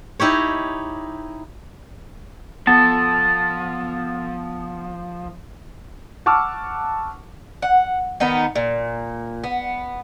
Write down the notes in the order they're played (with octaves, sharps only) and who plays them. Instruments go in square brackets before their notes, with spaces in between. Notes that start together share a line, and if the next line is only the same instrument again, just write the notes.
[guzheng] D#4 E4 G4 C#5
[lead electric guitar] F3 [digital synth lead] B3 [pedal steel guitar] A4 A5
[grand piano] F#5 A5 C#6 D6 E6 F6
[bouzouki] F#5
D#3 B3 D#4
A#2
B3